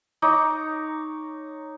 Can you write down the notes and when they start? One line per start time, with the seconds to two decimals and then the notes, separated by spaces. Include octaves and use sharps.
0.22 D#4 C#5 A#5 D6